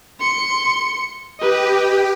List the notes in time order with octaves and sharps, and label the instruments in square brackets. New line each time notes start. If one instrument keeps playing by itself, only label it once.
[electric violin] C6 C#7
[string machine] G4 [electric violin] B4 D#5